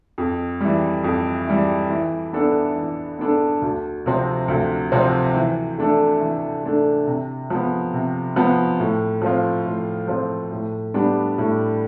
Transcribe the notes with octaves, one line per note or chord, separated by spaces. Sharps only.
F2
E3 G3
F2
E3 G3
E3
B3 D4 A4
E3
B3 D4 A4
D2
C3 F3 C4
D2
C3 F3 C4
E3
A3 D4 A4
E3
A3 D4 A4
C3
F3 B3
C3
F3 B3
A2
F3 C4 F4
A2
F3 C4 F4
A2
G3 B3 D4 G4
A2